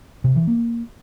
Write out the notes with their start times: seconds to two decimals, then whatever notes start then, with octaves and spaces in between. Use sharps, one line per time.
0.24 C3
0.36 E3
0.47 A#3